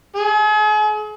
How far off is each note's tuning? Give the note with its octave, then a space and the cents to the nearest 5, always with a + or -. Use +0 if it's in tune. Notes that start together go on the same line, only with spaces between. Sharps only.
G#4 +40